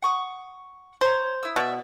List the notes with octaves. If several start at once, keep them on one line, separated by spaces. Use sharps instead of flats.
F#5 C#6 D#6
C5 C#5 A#5
E4 D#6 E6
B2 D5 E5